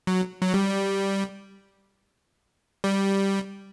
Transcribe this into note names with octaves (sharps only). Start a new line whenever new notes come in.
F#3
F#3
G3
G3